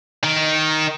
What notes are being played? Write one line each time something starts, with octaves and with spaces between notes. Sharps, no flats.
D#3